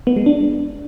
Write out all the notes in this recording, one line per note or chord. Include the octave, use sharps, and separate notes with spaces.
B3
G#3
D4